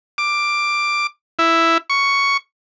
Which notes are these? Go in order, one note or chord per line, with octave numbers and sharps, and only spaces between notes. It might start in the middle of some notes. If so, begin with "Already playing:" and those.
D6
E4
C#6